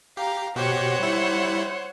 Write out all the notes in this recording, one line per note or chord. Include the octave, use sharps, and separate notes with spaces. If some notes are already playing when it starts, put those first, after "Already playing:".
G4 F5 A#5
B2 F#4 G4 C5 C#5 F#5
G3 E4